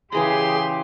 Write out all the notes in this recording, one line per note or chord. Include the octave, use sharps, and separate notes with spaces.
C#3 E3 G4 G#4 A#5 C6